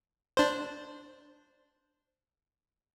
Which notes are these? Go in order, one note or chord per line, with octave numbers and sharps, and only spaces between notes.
D4 C5